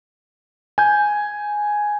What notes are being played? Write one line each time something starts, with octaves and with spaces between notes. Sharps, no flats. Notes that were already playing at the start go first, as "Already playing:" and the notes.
G#5 G6